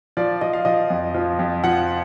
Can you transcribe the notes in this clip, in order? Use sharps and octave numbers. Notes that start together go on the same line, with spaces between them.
F3 D5
F3 D#5
F5
F3 D#5
F2
F3
F2
F3 F#5